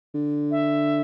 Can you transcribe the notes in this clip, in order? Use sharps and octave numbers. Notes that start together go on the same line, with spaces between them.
D3
E5